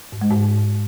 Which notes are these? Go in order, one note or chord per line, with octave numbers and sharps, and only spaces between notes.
G#2
G#3
G#2